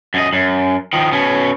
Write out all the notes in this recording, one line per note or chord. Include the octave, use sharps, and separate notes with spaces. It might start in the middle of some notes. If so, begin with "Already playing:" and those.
F#2 D#5
F#2
D#3 F3
B2 C#4